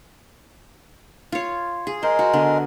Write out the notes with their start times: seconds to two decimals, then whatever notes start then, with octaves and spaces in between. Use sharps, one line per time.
1.32 F4 C#5
1.87 G#4
2.03 G#3 A#4 C5
2.19 F#4
2.33 D3 B3